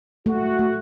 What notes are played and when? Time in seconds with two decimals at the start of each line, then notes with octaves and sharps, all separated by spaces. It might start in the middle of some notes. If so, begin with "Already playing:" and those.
0.26 A3 F#4
0.59 A3